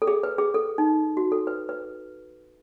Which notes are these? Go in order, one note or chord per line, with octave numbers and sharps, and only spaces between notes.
A4
G#4
B4
G#4
A4
D#4
F#4
A4
B4
B4